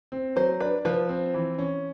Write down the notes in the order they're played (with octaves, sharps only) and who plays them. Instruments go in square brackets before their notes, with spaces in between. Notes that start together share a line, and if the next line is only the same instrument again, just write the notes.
[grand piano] C4
[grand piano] F#3 [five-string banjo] C5
[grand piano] D4 [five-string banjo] B4
[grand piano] F3 [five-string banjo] B4
[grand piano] C4
E3
C#4